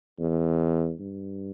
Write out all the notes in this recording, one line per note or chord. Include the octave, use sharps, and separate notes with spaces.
E2
G2